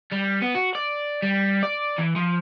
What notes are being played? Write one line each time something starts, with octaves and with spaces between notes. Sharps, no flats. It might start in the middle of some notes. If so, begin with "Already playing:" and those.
G3
B3
F#4
D5
G3
D5
E3
F3